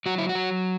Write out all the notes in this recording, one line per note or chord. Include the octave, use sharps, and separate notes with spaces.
F#3 F#4
E4
F#4
F#3